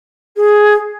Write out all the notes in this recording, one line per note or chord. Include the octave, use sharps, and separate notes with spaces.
G#4